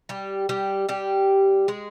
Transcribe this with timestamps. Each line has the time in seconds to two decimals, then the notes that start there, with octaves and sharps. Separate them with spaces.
0.09 G3 G4
0.49 G3 G4
0.89 G3 G4
1.68 G#3 G#4